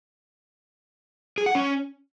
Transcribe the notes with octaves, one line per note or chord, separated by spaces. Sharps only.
G#4
F#5
C#4